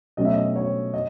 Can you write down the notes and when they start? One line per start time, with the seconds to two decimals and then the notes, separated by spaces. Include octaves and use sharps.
0.17 B2 F#3 A3 C#4 D#5
0.25 E5
0.33 D#5
0.56 C#5
0.94 D#5